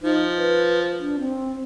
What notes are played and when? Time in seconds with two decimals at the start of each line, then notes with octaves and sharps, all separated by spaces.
0.02 F3 D#4
0.38 B4
0.99 D4
1.19 C4